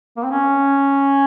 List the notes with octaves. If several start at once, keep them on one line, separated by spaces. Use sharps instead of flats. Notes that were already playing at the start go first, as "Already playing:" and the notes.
A#3
C4
C#4